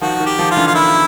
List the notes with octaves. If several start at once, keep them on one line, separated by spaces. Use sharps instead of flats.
D#3 F3 F#4
D#3
G4
D#3 F3
F4
D3 E3
F4
D#3 E4